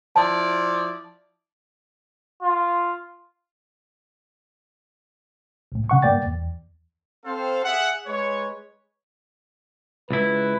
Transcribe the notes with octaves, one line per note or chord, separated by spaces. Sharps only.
F3 E4 D5 A5
F4
C2 A2
C#3 F#5 C#6
G2 A#3 D5 G5 A6
E2
C4 A4 C5 F5
G#4 E5 F#5
G#3 B4 C#5
C#2 E4 B4